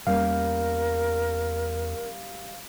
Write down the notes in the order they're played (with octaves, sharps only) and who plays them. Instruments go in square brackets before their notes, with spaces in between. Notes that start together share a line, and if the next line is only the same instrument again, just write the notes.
[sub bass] E2 [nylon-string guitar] G3 A#3 C#4 [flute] A#4 [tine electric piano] F5